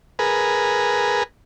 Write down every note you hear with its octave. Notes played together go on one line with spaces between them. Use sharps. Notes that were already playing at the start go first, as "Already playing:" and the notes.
G#4 A#4 B4